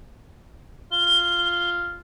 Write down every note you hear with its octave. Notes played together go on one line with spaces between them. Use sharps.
F4 G7